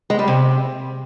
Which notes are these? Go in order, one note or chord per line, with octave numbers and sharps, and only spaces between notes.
G#3
G3
C3